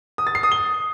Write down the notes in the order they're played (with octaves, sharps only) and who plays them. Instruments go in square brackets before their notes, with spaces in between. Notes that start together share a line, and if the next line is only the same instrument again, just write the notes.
[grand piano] D#6
A6
C7
D#6
G7